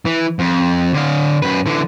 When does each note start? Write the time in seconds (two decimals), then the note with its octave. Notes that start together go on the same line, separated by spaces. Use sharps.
0.05 E3
0.39 F2
0.94 D3 F5
1.42 F#2 B4
1.66 D3 E3